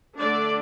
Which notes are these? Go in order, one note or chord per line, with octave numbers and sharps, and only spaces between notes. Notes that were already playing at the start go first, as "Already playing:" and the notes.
D3 A3 D4 D5